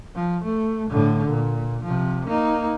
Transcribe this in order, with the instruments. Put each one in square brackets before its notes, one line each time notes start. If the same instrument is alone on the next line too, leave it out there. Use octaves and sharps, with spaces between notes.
[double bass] F3
A3
A2 D3
A#2
C3 F3
A#3 D#4